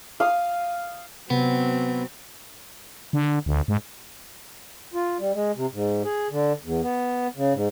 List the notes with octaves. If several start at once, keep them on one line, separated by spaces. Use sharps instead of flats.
F5 D#6
C3 F#3 B3 C4
D3
D2
G#2
F4
G3
G#3
C3
G#2
G#4
D3
E2
B3
C#3
G#2